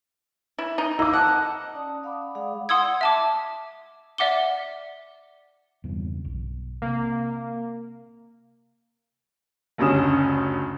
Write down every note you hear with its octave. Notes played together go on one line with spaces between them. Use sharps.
E4
D#4
A#3 D#4 F5 B5 D6 E6
F2 F#5 A5
C#4 D5 A5 D#6
D5 F5 F#5 B5 D6 D#6
G#3 G#4 D5 F5 F#5 D#6
F#5 C6 D#6 E6 G#6
E5 A5 D6
D5 E5 F#5 D6 G7
E2 G2 C#3
B1
C3 A#3
F#1 D2 G2 C#4 D#6 E7